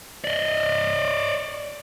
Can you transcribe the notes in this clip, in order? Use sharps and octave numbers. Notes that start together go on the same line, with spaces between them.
D5 D#5